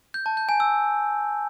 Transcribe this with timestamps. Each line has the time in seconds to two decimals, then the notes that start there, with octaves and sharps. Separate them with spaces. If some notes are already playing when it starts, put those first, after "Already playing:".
0.14 G6
0.26 A5
0.37 G6
0.49 G#5
0.60 E6